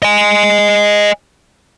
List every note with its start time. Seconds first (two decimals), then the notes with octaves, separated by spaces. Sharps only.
0.02 D#5 G#5